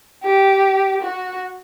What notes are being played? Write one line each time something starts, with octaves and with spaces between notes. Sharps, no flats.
G4
F#4